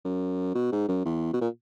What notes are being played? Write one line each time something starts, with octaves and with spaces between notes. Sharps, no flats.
F#2
B2
G#2
F#2
E2
B2
A#2